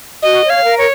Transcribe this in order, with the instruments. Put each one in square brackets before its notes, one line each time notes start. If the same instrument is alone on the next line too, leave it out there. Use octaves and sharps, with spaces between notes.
[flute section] F#4 [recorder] D#5
[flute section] C#5
[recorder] F5
[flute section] A#4
[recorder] C#5